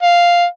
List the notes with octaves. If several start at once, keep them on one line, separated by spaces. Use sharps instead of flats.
F5